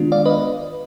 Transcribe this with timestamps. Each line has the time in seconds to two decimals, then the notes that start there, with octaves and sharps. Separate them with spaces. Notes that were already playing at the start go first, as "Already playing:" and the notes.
Already playing: D#3 G#3 B3 D4 F4
0.12 D5 F5
0.25 B4 D#5